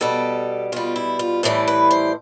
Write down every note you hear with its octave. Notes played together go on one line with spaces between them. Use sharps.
B2 G3 A4
B2 G3 F4
E4
F4
A2 E3 G3 A4
B4
C5